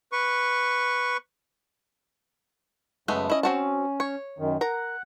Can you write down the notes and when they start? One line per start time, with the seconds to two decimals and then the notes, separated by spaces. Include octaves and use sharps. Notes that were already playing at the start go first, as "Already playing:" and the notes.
0.12 B4 C#6
3.08 F#2 C#3 G#3 A3 B3
3.30 C#4 E4 D#5
3.43 C4 F#4 A5
4.00 C#5
4.39 F#2 D#3
4.61 A#4 F#5 A#5